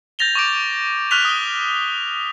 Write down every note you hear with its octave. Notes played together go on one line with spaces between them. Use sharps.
G6 A6 A#6 F7 G7
C#6 D6 D7
C#6 F6 F#6 B6 F7
D#6 G7